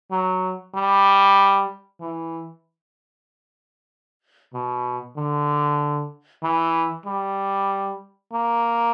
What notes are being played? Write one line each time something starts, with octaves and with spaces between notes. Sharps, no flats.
F#3
G3
E3
B2
D3
E3
G3
A#3